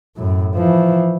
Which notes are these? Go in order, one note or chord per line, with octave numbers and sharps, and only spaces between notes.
F#2 A2
E3 F3